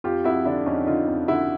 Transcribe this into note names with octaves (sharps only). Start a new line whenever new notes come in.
F2 F4 G4
F2 E4 F#4
D3 D4 E4
F2 C#4 D#4
D3 D#4 F4
F2
D3 E4 F#4